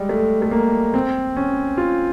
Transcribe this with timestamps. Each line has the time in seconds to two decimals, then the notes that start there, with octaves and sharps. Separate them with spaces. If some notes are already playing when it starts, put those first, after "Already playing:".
Already playing: G3 G#3
0.09 A3
0.42 A3
0.51 A#3
0.94 C4
1.37 C#4
1.78 F4